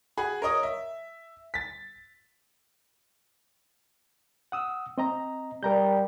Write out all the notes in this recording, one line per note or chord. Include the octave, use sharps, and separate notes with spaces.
F#4 G#4 B5
A#4 C#5 D#5 D#6
E5
A6 B6
F#5 D#6 E6
C4 D#5 A#5
G3 A#4 A#5 G6